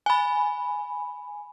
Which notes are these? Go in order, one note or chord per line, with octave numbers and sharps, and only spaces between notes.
G#5 B5